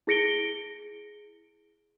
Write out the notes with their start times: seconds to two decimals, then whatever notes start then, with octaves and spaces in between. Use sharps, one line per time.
0.07 E4 G#4 A#6 C#7 D7 G7